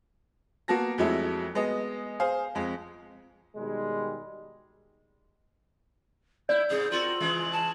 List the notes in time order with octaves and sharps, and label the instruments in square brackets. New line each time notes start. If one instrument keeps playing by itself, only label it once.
[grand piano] A#3 B3 F#4 A5 A#6
F2 F#3 G#3 A3 E4
G#3 B3 D#5
G#4 C5 F5
F2 G#3
[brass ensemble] B2 D#3 G3 G#3
[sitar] E4 [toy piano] D5 [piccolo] G6
[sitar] G#2 C3 [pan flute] G#4
[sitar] C4 F#4 A#4 [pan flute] F4 [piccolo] F#7
[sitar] C#3 E3 G#3
[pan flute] A5